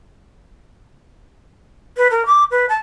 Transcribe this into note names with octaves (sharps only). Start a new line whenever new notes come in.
B4
A#4
D6
B4
A5